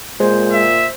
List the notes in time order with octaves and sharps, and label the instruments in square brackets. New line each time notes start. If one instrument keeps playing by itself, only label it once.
[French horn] A#2 [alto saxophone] G#3 [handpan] C5
[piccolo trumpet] E5